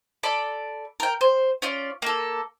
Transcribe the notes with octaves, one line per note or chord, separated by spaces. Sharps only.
A4 D5 B5
A#4 G5
C5
C#4 F4 D5
A#3 A4